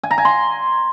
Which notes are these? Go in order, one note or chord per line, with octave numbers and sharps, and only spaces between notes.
G#5
A#5
G#5
C6